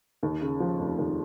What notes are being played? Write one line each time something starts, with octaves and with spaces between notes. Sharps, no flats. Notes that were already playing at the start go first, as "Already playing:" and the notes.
D#2
C#3
F3
F1
D#2